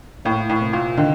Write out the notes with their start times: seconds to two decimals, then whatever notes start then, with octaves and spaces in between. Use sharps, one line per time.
0.25 A2 A#3
0.50 A2
0.61 C3
0.73 A#2
0.97 D3 D#3